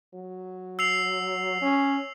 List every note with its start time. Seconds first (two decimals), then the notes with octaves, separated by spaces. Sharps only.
0.14 F#3
0.79 E6 C7 F7
1.62 C#4